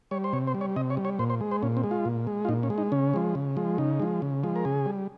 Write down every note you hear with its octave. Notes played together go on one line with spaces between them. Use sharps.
G3 C#5
C5
C3 C#5
C5
G3
C#5
C3 D#5
C#5
G3
C#5
A#2 C5
C5
G#3
C5
A#2 C#4
C4
G#3
F4
A#2
G#3
F4
A#2 D#4
C#4
G#3
D#4
C#3 C#4
F3 G#3
C#3
F3 G#3
C#3 D#4
F3 G#3
C#3
F3 G#3
A#4
C#3 G#4
G3